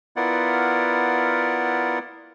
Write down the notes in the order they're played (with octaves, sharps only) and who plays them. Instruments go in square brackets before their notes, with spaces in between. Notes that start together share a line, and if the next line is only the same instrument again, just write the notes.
[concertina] B3 E4 F4 A#4 D5 F#5